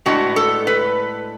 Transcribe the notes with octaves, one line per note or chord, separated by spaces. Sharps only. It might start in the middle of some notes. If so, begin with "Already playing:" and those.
A2 G#3 B3 D4 F#4
A4
B4